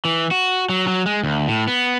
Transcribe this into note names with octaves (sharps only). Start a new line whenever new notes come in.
E3
F#4
F#3
F#3
G#3
D2
A2
B3